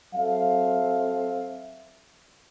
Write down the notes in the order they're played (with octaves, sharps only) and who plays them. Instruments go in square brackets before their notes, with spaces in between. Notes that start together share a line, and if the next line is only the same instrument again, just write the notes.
[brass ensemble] F#3 C4 A4 E5 F5